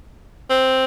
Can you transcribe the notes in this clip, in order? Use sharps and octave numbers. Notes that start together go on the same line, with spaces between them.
C4